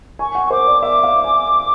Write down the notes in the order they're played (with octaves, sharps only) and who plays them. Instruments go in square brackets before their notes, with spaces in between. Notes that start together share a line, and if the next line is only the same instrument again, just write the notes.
[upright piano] G#5 [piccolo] C#6
[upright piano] F#5
[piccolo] C#6
[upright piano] C5 [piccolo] D6
[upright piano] D5
[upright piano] E5 [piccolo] D6
[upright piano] F5
G#5